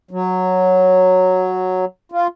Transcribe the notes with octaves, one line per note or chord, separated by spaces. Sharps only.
F#3
F4